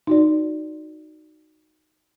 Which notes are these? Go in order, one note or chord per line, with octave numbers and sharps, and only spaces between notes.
D#4 F#4 D5